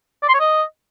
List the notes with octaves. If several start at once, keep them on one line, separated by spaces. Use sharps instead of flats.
D5
C6
C#5
D#5